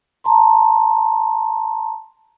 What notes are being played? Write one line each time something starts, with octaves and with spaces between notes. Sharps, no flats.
A5 A#5 C6